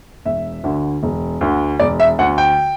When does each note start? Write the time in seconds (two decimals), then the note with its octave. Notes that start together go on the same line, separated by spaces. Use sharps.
0.25 E1 E5
0.64 D2 D3
1.03 E1
1.41 D2 D3
1.80 E1 D5
2.00 E5
2.19 D2 F#5
2.23 D3
2.38 G5